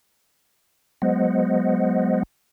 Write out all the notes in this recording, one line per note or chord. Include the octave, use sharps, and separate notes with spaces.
F#3 G#3 B3 C5 D#5 F#5